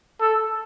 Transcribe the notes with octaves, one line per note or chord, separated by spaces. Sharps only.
A4